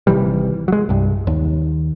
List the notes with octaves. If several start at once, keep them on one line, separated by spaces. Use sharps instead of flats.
G#1 C3 E3 G3
F#3 G#3
C2 G2
D#2